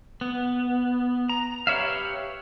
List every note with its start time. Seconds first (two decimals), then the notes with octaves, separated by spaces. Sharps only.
0.21 B3
1.29 A#5
1.67 G4 B4 C#5 E5 F5